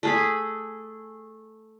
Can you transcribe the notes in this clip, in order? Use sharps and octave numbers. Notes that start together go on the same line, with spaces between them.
A3 G#4 B5